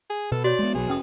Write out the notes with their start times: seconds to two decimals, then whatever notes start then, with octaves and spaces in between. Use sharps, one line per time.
0.10 G#4
0.32 B2 A4 B4
0.44 F#4 C#5 D5
0.59 G#3 B3
0.75 B1 B2 F#3 G#4
0.88 F1 C#4 B4 G5 D#6